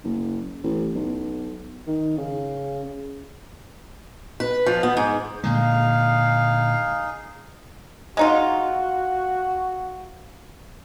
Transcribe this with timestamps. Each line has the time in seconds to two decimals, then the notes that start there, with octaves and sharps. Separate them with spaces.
0.04 F#1
0.64 A1
0.95 B1
1.87 D#3
2.18 C#3
4.40 B4
4.66 F3
4.83 B3
4.97 G#2
5.44 A#2 D3 G#3 D#4 G#4 F5
8.17 G#3 D#4 F4 F#4